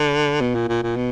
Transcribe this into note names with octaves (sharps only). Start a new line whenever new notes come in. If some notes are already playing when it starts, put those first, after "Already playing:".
Already playing: D3
B2
A#2
A#2
A#2
B2